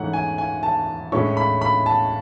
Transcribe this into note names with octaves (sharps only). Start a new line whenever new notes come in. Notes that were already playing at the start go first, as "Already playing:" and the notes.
Already playing: G#2 E3 A3 C#4 F#5
G#5
G#5
A5
A2 G#3 C#4 E4 C#6
B5
B5
A5